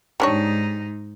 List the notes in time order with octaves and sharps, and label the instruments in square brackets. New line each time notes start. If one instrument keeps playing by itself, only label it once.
[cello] G#2 D#4 [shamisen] G3 D4 C#5